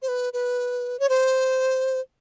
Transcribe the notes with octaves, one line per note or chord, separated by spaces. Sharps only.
C5
B4
B4
C#5
C5